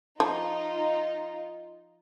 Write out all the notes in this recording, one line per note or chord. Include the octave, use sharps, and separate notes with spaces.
F3 D#4 F4